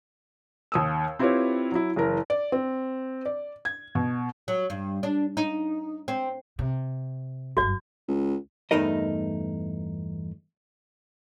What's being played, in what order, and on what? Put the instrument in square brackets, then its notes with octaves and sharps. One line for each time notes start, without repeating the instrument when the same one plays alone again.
[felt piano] D#2 D#6 E6
C4 E4 F4 G4 B4 C#5
F#3 E4
F#1 E3 A#4
D5
C4
D5
G#6
B2
[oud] F#3
G2
D4
D#4
C4
[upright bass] C3
[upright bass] G1 F#2 [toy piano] F#4 D5
[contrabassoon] C#2
[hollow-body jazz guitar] E2 G2 A3 D#4 A#4 D#5